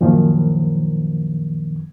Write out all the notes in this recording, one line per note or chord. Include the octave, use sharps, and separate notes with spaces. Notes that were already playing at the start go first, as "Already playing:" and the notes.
F#2 A#2 D#3 F3